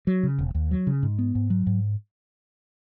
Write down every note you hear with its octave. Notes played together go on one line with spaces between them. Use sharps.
F#3
C#3
E1
D#2
F#3
C#3
G#2
B3
G#2
F#3
G#2